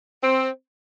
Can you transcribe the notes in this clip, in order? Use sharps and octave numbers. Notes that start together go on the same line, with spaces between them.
C4